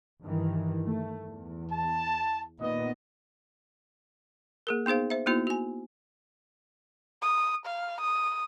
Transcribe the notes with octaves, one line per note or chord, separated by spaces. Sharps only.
G2 D#3 E3
A3
E2
A5
A#2 D#3 B3 D#5
A#3 G#4 A#4
B3 D#4 G#4 C5 F5
C5 E5
A#3 B3 D#4 E4 F#4 C5
F#4 G#5
D#6
F5
D#6